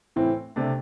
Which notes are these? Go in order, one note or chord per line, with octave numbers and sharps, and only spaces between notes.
A2 E3 C4 E4
C3 A3 D4